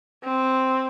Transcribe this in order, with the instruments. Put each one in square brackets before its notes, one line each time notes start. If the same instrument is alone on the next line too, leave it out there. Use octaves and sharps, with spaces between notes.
[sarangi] C4